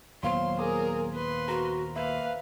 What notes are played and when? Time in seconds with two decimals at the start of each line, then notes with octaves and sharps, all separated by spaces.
0.23 D#2 A#2 F#3 B3 C5 F5 C6 C#6
0.59 G#4 A#4 D6 D#6
1.14 B4 C6
1.48 F#4 A#4
1.96 A#3 B4 E5 F5